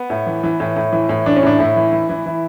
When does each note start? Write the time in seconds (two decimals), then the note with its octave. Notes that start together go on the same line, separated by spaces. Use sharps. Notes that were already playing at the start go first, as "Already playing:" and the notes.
Already playing: B3
0.10 A2
0.26 E3
0.43 E3
0.60 A2
0.76 A2
0.92 E3
1.09 A2
1.26 E3 D4
1.36 C#4
1.43 A2 D4
1.59 A2 E4
1.76 E3
1.92 E3
2.09 E3
2.26 E3